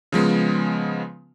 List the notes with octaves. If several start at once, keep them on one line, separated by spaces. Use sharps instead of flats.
C#3 F3 G#3 B3